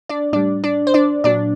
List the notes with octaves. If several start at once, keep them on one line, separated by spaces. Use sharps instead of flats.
D4 D5
A2 G3 D4 D5
D4 D5
C5
D4 D5
A#2 F#3 D4 D5